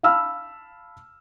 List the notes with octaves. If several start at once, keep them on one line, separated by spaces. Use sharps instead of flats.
F5 A5 B5 E6 F6